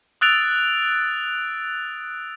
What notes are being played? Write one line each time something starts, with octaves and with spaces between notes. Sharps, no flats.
D#6 E6 F#6 A6 D7 F7